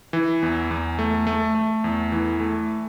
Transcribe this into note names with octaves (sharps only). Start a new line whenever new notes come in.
E3
E2
E2
A3
A3
A3
E2
E3
A3